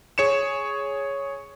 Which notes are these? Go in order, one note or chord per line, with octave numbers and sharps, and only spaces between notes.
G#4 C#5 C#7 E7